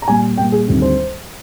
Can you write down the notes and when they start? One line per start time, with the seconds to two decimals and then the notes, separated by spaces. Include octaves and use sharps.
0.02 A#5
0.08 A#2 G3 A#3 G#5
0.38 A#2 G3 A#3 G5
0.52 G#4
0.67 D2 C3 D#3 G3 C4
0.82 C5